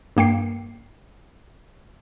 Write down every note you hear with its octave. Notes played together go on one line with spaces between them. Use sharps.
G2 A#3 G5 C7